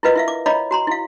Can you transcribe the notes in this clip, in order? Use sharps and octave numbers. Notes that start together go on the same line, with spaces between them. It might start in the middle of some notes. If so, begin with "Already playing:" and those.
E4 F4 A#4 B4 D#5 F5
E4 E5 F5
D6
C#5 D#5 F5 A#5 B5 D6
F#4 A#5 C6
E4 F5